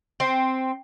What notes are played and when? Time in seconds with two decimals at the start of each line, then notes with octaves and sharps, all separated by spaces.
0.20 C4